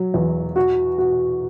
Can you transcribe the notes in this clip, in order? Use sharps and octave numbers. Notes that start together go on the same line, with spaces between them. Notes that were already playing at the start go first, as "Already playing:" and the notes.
Already playing: F#3
E2
F#4
F#4